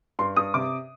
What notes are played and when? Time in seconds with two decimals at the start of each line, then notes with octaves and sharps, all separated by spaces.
0.19 G2 C6
0.36 G2 D#6
0.54 C3 D6